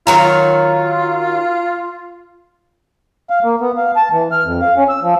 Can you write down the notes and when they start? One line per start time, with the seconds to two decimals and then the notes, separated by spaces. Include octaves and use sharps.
0.07 D#3 F#3 F4 A#5
3.30 F5
3.44 A#3
3.61 B3
3.77 F5
3.96 A5
4.12 E3
4.32 F6
4.45 F2
4.62 F5
4.77 C#4
4.89 E6
5.02 F3